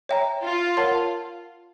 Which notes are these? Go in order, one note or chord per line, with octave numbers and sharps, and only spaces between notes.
C#5 E5 G5 A#5
F4
A#4 C#5 F#5 A5 C6